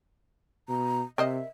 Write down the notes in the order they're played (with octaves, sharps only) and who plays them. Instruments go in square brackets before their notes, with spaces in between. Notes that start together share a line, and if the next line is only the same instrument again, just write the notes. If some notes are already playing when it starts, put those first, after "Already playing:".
[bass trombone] B2 [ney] A#5
[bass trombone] C3 [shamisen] A#4 C5 D#5 [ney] E5